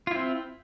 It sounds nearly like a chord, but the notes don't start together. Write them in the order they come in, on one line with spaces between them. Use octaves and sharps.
F4 E4 C4